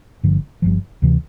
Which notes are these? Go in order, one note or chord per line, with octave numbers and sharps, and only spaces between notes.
G1 G2 D3 F3
G1 G2 D3 F3
D2 C3 E3